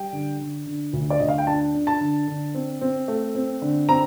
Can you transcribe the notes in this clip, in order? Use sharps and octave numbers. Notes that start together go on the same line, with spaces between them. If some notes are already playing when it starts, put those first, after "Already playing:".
Already playing: G3 G5
D3
D3
D3
D2
D5
D2 D#5
F5
G5
D4 A5
D4
A5
D3
D3
C4
C4
A3
C4
D3
C4 A#5